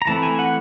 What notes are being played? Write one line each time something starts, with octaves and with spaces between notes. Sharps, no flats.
A#5
E3 A3 C4 E4 A5
G#5
F#5